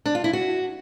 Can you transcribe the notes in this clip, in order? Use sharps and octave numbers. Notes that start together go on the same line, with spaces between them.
D4
F4
E4
F#4